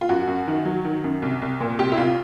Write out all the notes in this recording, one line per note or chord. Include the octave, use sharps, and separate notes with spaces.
F4
F#2 F#4
F#2
D#3
F#3
D#3
F#2
C2
C2
A#2
C2 G4
E4
C2 F4